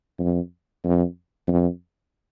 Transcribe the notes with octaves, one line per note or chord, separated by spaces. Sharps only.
F2
F2
F2